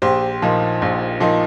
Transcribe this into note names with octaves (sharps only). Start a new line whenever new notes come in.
A#1 G4 C5
A#2 F3 D#4
A#1
A#2 F3 D#4